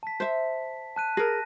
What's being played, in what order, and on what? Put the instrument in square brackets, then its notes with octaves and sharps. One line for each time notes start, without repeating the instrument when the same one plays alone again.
[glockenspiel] A5 B6
[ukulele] C5 E5
[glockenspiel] A5 F#6 D#7
[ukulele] G#4 A#4 [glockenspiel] A#6